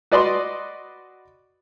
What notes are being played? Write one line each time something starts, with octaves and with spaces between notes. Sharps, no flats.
F#4 B4 D5 D#5 B5 C6